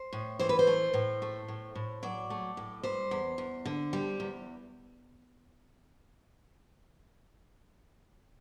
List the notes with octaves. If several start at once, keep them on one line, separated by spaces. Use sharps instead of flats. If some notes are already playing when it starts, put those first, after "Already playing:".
Already playing: C5
A2
E3 C5
B4
C5
A3
A2
A3
A2
A2
F#3 D5
A3
A2
G3 C5
E2
E2
D3
G3
E2